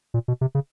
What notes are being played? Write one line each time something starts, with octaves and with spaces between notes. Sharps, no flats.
A#2
B2
C3
C#3